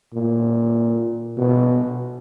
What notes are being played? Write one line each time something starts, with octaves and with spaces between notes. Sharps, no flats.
A#2
B2